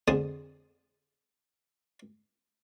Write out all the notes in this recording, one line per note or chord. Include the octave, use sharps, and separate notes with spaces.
F2 D3 G#4 C5 A5 D#6